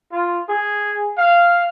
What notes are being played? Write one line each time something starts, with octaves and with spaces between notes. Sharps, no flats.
F4
G#4
F5